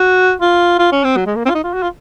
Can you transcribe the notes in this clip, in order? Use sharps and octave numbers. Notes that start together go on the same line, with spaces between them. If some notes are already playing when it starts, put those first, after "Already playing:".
Already playing: F#4
F4
F4
C#4
C4
F#3
G#3
A#3
C4
F4
D#4
F4
F#4
F4